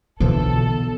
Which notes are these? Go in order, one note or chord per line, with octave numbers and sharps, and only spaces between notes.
B1 B2 D3 E3 F3 A4